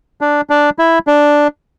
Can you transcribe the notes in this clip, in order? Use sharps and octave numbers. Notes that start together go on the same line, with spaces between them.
D4
D4
E4
D4